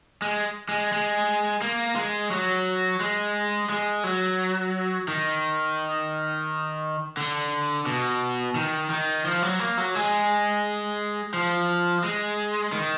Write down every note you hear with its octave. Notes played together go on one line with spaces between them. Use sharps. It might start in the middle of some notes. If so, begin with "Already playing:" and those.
G#3
G#3
G#3
A#3
G#3
F#3
G#3
G#3
F#3
D#3
D3
B2
D#3
D#3
F3
F#3
A#3
F#3
G#3
F3
G#3
D#3